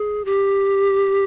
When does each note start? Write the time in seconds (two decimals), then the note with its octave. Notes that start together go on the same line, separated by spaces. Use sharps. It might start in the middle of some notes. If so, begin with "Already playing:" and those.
Already playing: G#4
0.25 G4